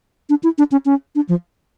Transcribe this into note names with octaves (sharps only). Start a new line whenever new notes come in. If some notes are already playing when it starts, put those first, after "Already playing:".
D4
E4
D4
C#4
C#4
D4
F3